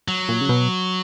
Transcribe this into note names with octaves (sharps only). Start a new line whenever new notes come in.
F#3
A#2
C#3
B2